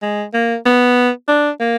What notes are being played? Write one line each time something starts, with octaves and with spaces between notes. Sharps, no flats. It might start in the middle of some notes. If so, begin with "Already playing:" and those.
G#3
A#3
B3
D4
A#3